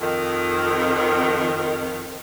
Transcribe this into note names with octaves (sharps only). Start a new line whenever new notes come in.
F2 D#3